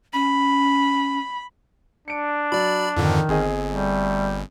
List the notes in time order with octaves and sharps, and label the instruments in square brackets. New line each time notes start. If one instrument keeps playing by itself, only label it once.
[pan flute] C#4 [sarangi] B5
[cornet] D4 [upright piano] C#7 D7
[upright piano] F#3 [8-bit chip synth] D5 B5
[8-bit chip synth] F2 G#2 D3 [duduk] D#3 [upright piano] F3
[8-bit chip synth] G1 [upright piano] C4 G#4 D#5
[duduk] G3 [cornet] A3